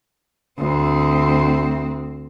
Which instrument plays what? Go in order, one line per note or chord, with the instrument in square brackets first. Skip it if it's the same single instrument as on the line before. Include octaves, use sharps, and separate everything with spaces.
[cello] D2 C4